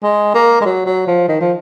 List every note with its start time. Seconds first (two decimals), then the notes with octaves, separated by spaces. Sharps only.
0.03 G#3
0.35 A#3
0.61 G#3
0.65 F#3
0.86 F#3
1.07 F3
1.29 D#3
1.40 F3